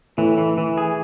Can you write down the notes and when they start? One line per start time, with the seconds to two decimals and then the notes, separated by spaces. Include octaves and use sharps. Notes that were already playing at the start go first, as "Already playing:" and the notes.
0.18 A2 E3
0.38 E3
0.58 E3
0.78 G#4